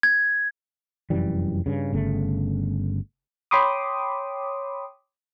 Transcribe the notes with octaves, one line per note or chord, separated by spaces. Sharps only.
G#6
F1 F#2 E3 G3
G2 C#3
G1 C#3 A3
C#5 G5 B5 C6 D6 D#6